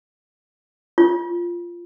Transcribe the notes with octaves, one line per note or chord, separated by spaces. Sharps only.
F4